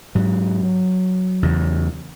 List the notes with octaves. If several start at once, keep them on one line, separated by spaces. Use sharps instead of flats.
G#2 F#3
E2 C#3